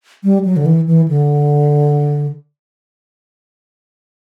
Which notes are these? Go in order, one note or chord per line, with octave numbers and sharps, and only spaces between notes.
G3
F#3
D3
E3
E3
D3